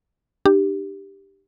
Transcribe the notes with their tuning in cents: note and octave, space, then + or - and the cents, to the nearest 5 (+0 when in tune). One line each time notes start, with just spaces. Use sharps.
D4 +45 G4 +0